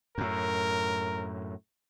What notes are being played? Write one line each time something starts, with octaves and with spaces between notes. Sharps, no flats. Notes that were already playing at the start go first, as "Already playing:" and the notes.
F#2 A2 A#4